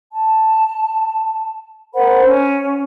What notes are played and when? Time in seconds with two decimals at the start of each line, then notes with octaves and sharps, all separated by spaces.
0.12 A5
1.95 A#4 C5 F#5 B5
2.25 C#4